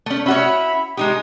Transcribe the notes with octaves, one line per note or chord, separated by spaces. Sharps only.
A3 C#4
C#4 E4 F#4 C#5 E5 B5
G#3 D#4 G4 D#6